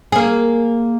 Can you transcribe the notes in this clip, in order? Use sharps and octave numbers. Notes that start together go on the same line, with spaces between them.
A#3 G#4